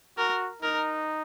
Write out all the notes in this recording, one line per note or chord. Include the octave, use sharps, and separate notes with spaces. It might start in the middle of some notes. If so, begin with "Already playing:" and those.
F#4 A#4
D#4 A#4